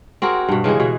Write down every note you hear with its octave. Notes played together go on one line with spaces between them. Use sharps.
C4 F#4 G#4 A#4
G2 B2
C#3 E3 G#3 G#4
B2 G#4